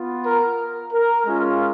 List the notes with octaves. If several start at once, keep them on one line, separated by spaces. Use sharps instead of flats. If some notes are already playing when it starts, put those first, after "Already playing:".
Already playing: B3 F4
A#4
A#4
G#3 C#4 F4